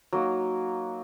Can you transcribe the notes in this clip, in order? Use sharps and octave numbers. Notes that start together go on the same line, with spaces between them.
F#3 A#3 D#4